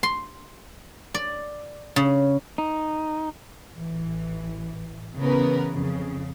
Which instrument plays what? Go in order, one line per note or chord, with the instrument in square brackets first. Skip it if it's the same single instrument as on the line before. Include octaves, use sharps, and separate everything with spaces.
[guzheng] C6
D5
C#3
[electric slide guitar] D#4
[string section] A1 E3
C#3 E3 B3 A#4 B4
F2 C#3